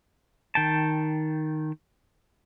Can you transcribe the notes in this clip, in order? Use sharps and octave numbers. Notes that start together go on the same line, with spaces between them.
D#3 G5 A5